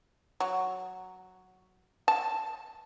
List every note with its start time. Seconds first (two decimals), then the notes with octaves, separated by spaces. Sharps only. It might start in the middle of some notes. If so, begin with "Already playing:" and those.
0.40 F#3
2.08 A5